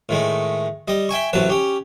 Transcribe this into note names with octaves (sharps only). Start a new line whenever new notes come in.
A2 D#3 G#3 A3
G3 D#5
E5 G5 G#5 C#6
A1 C3 F#3 B4 A5
C#4 G4